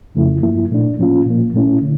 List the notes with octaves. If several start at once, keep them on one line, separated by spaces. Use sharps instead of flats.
F2 C#3 F3 A3 E4
G2 F3 A#3 E4
A#2 A3 D4
A2 F3 A#3 C#4 F4
A#2 F3 A#3
A#2 A3 C#4 E4
D3